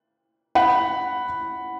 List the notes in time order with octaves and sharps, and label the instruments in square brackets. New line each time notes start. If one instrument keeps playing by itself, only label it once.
[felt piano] F#5 B5